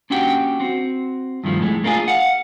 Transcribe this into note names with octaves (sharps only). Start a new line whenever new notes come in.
A#3 C#4 D4 F#4 G4 G5
C4 F#4
G2 D#3 F3 A3
F2 A2 D#3 G#3 A3
A3 A#3 D4 E4 F4 G#4
F5 F#5